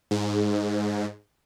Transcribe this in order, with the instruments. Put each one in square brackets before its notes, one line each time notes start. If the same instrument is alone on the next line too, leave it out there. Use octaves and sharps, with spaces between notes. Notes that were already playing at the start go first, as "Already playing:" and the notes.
[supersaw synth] G#2